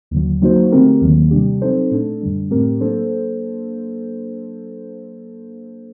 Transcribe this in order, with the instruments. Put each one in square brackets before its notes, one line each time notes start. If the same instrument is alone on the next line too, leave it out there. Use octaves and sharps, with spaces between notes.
[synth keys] D#2 D3 F#3
F#3 A#3 D#4 F#4 C5
D3 A3 C4 G4 A#4
D#2 D#3 F#3 A#3
C3 G3 D4 G4
F#3 C4 D#4 A4 C5
A#2 A3 D4 A4
F#2 D3 G3 D4
A2 A3 C4 G4 A#4
F#3 A#3 D4 A4 C5